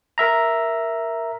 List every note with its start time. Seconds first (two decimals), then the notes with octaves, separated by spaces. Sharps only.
0.18 A#4 E5 A#5